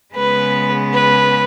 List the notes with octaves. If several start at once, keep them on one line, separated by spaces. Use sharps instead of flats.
C#3 G#3 B3 B4
B4